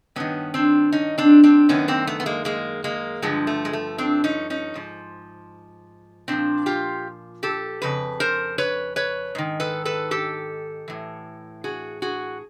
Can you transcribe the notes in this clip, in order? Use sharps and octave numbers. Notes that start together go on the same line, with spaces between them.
G2 D#3 B3 C#4
C4 D4
C#4 D#4
C4 D4
C4 D4
F#2 D#3 B3 C#4
A#3 C4
A3 B3
B3
G#3 A#3
G#3 A#3
G#3 A#3
G2 D3 F3 G#3
A3
G#3
A3
C4 D4
C#4 D#4
C#4 D#4
G#2 F3
A#2 F3 C4 D4
F4 G4
G4 A4
F2 C#3 B4
A#4 C5
B4 C#5
B4 C#5
G#2 D#3
A4 B4
A4 B4
G4 A4
A2 E3
F#4 G#4
F#4 G#4